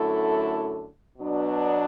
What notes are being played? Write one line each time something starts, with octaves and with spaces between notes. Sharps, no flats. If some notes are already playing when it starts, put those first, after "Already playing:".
Already playing: F#2 D3 A3 E4 A4
B2 F#3 B3 D4